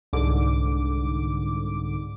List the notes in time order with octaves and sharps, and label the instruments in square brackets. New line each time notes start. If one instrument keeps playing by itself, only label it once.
[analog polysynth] C2 G#2 D3 D6